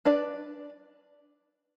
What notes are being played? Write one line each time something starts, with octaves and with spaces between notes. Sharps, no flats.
D4 B4 D5